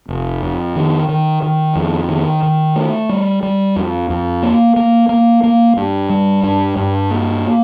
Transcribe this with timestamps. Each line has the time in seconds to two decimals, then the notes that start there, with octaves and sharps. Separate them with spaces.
0.09 F1
0.42 F2
0.76 D#3
1.09 D#3
1.42 D#3
1.76 F2
2.08 D#3
2.43 D#3
2.76 A3
3.09 G3
3.43 G3
3.76 F2
4.10 F2
4.43 A#3
4.76 A#3
5.09 A#3
5.43 A#3
5.77 G2
6.10 G3
6.43 G2
6.76 G2
7.10 A#3